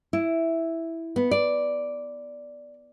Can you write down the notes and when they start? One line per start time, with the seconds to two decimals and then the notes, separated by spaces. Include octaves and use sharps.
0.13 E4
1.16 B3
1.31 D5